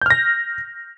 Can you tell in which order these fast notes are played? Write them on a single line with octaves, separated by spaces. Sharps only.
G6 F6 A#6